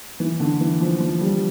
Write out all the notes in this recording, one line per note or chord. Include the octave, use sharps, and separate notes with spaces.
E3
D3
E3
F3
F3
G3